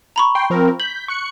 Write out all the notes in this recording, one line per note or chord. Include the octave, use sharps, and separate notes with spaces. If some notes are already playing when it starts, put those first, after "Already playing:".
A#5 B5 C#6
G5 C6
F3 C4 A#4
G6 B6 F#7
C#6 F#6 C#7